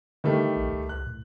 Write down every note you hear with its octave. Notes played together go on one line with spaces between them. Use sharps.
D3 D#3 G3 A3
A#1
C#2
C#2 F#6
A2